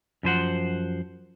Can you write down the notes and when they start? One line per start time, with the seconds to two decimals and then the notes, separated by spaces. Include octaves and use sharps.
0.23 F#2 F3 C5 F#5